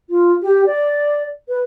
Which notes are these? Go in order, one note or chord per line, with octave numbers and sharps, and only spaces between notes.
F4
G4
D5
B4